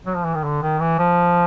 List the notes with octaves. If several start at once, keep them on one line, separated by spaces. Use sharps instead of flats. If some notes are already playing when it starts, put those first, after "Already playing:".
F#3
F3
E3
D#3
D3
D#3
E3
F3